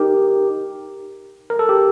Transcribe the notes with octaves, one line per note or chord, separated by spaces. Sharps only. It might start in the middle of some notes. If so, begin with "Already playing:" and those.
Already playing: D#4 G4 A#4
A#4
A4
G4